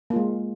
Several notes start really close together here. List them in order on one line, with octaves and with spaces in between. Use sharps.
A#3 F4 G#3